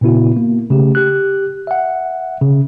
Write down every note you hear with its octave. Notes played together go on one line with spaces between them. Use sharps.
A#2 C#3 B3 E4 F#4
A#3
C#3 A3 G4
G4 F#6
E5 F#5
C#3